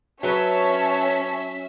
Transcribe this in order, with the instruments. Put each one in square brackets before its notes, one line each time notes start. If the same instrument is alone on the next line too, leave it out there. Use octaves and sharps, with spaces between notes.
[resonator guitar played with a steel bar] F#3 B4 [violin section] C#4 E5 B6 [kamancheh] C#5 A5